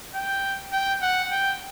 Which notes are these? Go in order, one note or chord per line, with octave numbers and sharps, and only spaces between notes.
G5
G5
F#5
G5